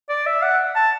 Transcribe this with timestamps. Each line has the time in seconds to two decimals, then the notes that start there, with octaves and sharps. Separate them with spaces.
0.09 D5
0.26 E5
0.42 F#5
0.76 A5